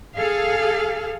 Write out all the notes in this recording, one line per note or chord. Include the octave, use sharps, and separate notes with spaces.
G#4 A4 F5